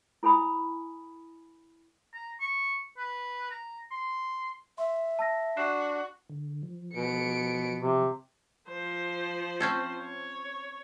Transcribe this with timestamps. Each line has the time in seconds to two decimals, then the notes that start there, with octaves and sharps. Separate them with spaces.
0.23 E4 A4 G#5 B5 D#6
2.14 A#5
2.40 C#6
2.97 B4
3.51 A#5
3.91 C6
4.78 E5 C6
5.19 A5 E6 A#6
5.57 D4 F#4 F#6 C7 E7
6.30 D3
6.63 F3
6.96 B2 C#7 D7
7.80 C3
8.69 F3 C5
9.60 C4 C#4 A4
10.02 C#5